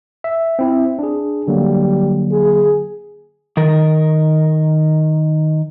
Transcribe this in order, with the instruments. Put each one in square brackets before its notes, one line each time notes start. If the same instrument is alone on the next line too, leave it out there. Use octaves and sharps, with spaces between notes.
[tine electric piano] E5
C4 E4 E5
D4 G#4
[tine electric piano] D3 F#3 A#3 [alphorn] G3
[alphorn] G#4
[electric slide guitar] D#3 A#4